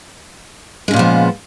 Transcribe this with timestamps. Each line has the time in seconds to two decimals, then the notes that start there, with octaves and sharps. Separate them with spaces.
0.88 G#3
0.91 C#3
0.94 A#2
0.96 B3
0.99 F3